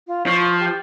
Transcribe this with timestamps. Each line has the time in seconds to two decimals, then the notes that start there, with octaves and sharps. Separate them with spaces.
0.07 F4
0.26 F3 C#6
0.60 G4